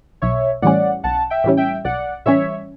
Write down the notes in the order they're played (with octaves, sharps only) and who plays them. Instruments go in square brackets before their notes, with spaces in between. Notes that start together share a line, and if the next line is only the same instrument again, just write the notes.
[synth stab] B1 [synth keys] C#5 E5
[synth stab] A2 E3 G3 C#4 [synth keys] D5 F#5
[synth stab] B1 [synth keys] F#5 A5
[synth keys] E5 G5
[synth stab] A2 E3 G3 C#4
[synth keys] E5 G5
[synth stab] B1 [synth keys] D5 F#5
[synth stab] A2 E3 G3 C#4 [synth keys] C#5 E5